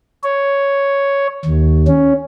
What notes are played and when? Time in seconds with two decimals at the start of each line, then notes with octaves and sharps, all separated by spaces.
0.24 C#5
1.45 D#2
1.87 C#4